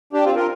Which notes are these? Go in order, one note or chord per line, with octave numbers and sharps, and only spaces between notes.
D4 G4
C4 F4
F4 A#4